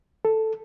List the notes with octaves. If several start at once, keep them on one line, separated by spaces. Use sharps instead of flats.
A4